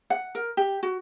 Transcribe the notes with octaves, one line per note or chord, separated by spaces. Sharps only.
F#5
A#4
G4
F#4